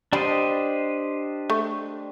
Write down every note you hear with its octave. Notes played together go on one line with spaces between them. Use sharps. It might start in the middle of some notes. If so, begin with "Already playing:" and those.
G3 D4 G4 C5 D#5
A3